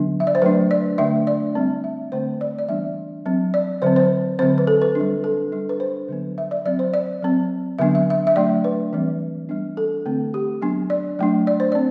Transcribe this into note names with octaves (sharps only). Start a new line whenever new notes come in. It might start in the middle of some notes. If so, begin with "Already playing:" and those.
Already playing: D3 F#3 B3 D4
E5
D5
C5
F#3 A3 D4 B4
D5
D3 A3 D4 E5
D5
G3 C4
E5
D3 A3 C4 C5
D5
D5
E3 G3 B3 D4 E5
F#3 C4
D5
D3 F#3 C4 C5
C5
D3 F#3 C4 C5
B4
A4
B4
G3 D4
A4
G3 D4
B4
C5
D3 F#3 B3
E5
D5
F#3 C4 D5
C5
D5
F#3 C4
D3 F#3 B3 D4 E5
E5
E5
E5
F#3 A3 D4 D5
B4
E3 G3 C4
G3 B3 D4
A4
D3 A3 C4
G4
F#3 B3 D4
D5
F#3 A3 D4
D5
C5
C4 D5